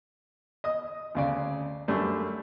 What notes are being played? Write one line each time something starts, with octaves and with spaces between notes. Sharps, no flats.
D#5 D#6
D2 C#3 D5
F#2 G3 A3 D4